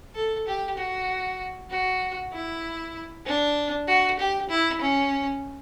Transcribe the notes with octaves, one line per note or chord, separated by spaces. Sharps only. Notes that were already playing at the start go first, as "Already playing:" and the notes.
A4
G4
F#4
F#4
E4
D4
F#4
G4
E4
C#4